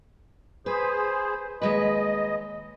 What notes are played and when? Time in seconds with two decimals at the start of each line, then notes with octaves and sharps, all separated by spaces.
0.66 G#4 B4 C5
1.61 D#2 G#3 B4 D#5